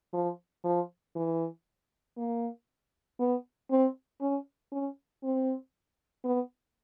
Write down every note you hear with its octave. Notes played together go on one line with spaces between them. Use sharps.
F3
F3
E3
A#3
B3
C4
C#4
C#4
C4
B3